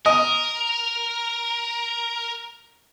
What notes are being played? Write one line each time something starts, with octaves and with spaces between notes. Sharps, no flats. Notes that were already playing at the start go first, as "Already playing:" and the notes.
A#4 D#5